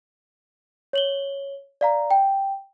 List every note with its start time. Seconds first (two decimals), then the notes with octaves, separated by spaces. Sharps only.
0.93 C#5 F#7 G7
1.81 D5 F5 A#5
2.11 G5